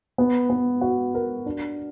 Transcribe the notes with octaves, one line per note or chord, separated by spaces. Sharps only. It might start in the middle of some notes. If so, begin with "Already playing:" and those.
B3
B3
F#4
A#4
D4